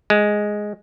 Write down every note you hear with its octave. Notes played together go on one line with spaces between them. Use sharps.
G#3